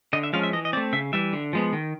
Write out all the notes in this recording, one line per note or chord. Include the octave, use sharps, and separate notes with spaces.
D3 D#5
E5
F3 G#3 C#4 F5
E5
E3 D#5
D#5
A3 C4 D5
C#3 E5
E3 G3 E5
D3
F3 G#3 B3
D#3